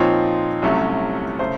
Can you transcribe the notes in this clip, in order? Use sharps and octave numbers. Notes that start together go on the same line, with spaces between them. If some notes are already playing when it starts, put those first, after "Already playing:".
Already playing: A#2 F3 C4 D#4 C#5
C2 C3 F#3 A3 C#4
C#3 A3 C5